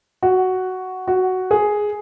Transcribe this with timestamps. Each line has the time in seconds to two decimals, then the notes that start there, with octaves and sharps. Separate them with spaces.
0.23 F#4
1.08 F#4
1.51 G#4